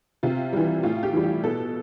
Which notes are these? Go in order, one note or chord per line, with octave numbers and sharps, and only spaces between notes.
C3 F4
E3 G3
A2 F4
G4
E3 G3
G4
B2 A4